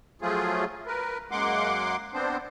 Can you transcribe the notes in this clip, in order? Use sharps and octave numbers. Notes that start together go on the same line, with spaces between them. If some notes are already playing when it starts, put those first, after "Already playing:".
F3 F#3 A3 F4 G#4
A#4 B4
F#2 G#3 A#3 F#5 C6 D6
B3 C4 D4 C5